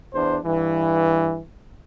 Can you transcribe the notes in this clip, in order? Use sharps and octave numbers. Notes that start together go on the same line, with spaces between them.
E2 D4 C5
G2 E3